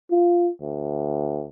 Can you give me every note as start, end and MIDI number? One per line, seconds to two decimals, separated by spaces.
0.11 0.50 65
0.62 1.47 38